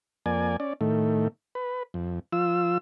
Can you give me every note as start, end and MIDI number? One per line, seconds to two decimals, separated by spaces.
0.26 0.57 41
0.26 0.57 58
0.26 0.57 74
0.26 0.57 80
0.60 0.73 61
0.60 0.73 74
0.81 1.28 45
0.81 1.28 51
0.81 1.28 57
1.55 1.83 71
1.94 2.19 41
2.32 2.78 53
2.32 2.78 65
2.32 2.78 88